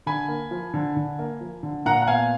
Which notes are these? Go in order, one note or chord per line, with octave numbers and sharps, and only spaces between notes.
D3 G#5 B5
A#3
F3
D3
D3
A#3
F3
D3
A#2 F#5 A#5
F#5
B3 F5 G#5